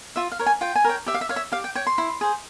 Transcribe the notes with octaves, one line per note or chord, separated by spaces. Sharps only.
F4 E5
F5
A#4 C#5
G#5
F4 G5
G#5
A#4 C#5 G5
G4 E5
F5
E5
C#5 F5
E5
G4 F5
G5
C#5 G5
C6
E4
G#4 C5